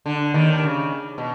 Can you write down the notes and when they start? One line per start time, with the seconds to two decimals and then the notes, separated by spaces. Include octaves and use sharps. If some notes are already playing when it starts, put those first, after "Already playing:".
0.06 D3
0.34 D#2 D#3
0.62 C#3
1.18 B2